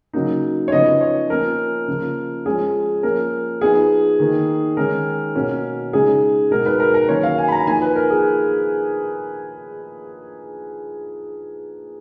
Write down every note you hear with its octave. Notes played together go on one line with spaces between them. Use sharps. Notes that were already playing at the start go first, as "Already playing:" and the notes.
C#3 F#3 A#3 D#4
C#5
C#3 F3 B3 D#4 D#5
C#5
F3 A#3 C#4 A#4
C#3 F3 A#3
F3 G#3 C#4 G#4
F3 A#3 C#4 A#4
F3 B3 D#4 G#4
D#3 A#3 D#4
D#3 G#3 C#4 A#4
B2 A#3 C#4
C#3 G#3 D#4 G#4
B2 G#3 D#4 A#4
B4
A#4
A#4
D#3 F#3 A#3 C#4 C#5
F5
G#5
B5
A#5
F3 A#3 D#4 G#5
B4
A#4
G#4